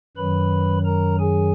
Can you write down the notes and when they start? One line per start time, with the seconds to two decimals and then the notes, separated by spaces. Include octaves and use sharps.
0.17 F#2 D#3 F#3 B4 B5
0.85 A#4 A#5
1.20 G#4 G#5